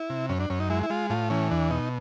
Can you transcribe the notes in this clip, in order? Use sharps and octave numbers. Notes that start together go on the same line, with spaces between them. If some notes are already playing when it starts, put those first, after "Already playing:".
Already playing: E4
C3
F#2 C#4
D4
F#2 C#4
D#4
G#3 E4
E4
G#3 F4
A2 F4
E3 C#4
E2 D4
B2 D#4